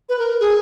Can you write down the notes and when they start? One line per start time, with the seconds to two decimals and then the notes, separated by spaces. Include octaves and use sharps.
0.09 B4
0.19 A#4
0.40 G#4